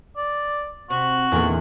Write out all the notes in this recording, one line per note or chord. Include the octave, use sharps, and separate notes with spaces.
D5
C3 F#4
E2 A#2 D3 D#3